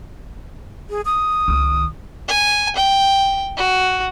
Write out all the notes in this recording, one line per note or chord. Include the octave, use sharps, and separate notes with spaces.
G#4
D#6
C#2 D#3
G#5
G5
F#4